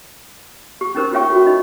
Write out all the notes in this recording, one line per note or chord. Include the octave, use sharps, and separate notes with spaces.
G4 C#6
C#4 D#4 A#4 C5
F4 G4 C#5 E5 G5 C#6
F#4 A4
D#4 D#5